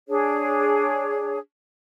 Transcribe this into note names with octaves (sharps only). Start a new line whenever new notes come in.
D4 G#4 C#5